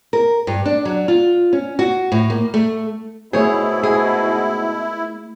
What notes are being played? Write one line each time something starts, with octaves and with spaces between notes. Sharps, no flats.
A#4
G2
D4
F#3
F4
C#4
F#4
A2
A#3
A3
G#2 B2 A3 A#3 E4 G#4 C5 C#5
G#4